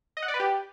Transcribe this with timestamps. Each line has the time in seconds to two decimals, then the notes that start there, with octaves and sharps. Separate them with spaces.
0.17 D#5
0.22 F#5
0.28 D5
0.34 B4
0.40 G4